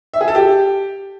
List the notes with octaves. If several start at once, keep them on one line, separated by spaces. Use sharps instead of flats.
E5
G#4
A4
G4